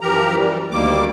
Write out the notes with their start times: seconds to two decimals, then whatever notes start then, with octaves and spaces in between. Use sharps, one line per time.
0.01 F#2 E3 F3 G4 A#4 A#5
0.36 E3 G3
0.71 D2 D#3 G3 A#3 D6